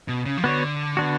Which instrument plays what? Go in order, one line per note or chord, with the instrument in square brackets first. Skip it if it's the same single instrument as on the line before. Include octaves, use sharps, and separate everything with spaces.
[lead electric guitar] B2
C#3
F3
[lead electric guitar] D3 [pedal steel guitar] B3 F#4 C#5
[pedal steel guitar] B3 D4 F#4